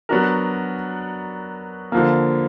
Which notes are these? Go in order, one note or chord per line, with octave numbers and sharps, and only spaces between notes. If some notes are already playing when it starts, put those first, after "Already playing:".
F#3 B3 D4 F#4 A#4
D3 F3 A#3